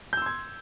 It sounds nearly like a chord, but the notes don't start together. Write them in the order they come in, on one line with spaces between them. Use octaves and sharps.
G6 E6 C6 G#6